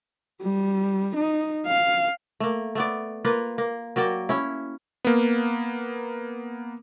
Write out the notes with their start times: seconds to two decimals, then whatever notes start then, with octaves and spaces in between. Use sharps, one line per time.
0.42 G3
1.16 D#4
1.66 F5
2.40 A3 A#3
2.75 A3 B3 D5
3.25 A#3 F4 B4
3.58 A#3
3.96 F#3 A#3 D5 G5
4.29 C#4 E4
5.05 A#3 B3